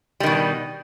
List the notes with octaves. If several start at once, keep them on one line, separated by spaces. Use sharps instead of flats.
B2 D#3 G3